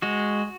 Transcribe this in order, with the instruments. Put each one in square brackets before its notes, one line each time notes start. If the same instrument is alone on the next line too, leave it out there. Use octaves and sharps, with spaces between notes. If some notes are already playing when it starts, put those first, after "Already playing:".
[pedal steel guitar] G#3 F#4